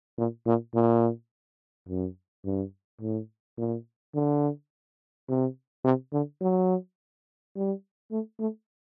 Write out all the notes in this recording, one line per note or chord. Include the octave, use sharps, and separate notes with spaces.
A#2
A#2
A#2
F#2
G2
A2
A#2
D3
C3
C3
D3
F#3
G3
A3
A3